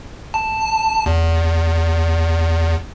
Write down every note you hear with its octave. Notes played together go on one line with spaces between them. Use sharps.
A5
E2